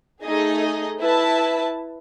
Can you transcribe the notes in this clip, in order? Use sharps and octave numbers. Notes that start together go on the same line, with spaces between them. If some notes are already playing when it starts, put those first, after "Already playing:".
A3 D#4 G#4 D#5
E4 B4 E5 A5